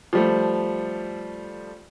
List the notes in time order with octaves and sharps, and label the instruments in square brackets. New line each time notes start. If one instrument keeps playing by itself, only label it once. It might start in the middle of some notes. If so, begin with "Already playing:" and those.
[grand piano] F3 G3 A3